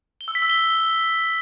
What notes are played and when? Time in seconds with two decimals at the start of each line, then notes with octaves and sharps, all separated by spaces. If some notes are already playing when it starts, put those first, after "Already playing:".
0.21 G7
0.28 E6
0.35 B6
0.42 E6
0.50 G7